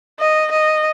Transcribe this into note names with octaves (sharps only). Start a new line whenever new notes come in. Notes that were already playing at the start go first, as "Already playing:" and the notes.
D#5
D#5